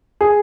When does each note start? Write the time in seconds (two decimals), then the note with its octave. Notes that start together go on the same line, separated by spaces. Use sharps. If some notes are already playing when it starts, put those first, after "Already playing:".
0.21 G#4